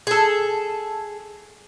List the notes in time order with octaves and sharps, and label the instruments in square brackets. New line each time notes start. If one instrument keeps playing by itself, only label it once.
[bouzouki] G#4 A4